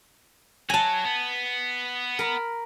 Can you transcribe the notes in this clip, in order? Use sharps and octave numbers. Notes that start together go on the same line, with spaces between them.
F#3 G#5 A5
B3
A#4 B5